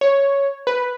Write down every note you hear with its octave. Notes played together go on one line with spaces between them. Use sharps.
C#5
B4